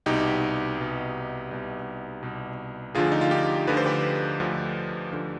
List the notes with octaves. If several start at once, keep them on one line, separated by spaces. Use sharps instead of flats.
C2 B2 D#4 G4
C2 B2
C2 B2
C2 B2
D2 D3 F3 F4 G#4
D#4
F4
D#4 G4
D2 D3 F3 B4
C5
G4 B4
D2 D3 F3
D2 D3 F3